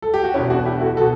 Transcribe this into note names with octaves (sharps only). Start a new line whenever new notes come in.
A4
G4
F#4
E2 B2 C#4 E4
D4 F#4
E4 G4
F#4 A4
B2 F#4 A4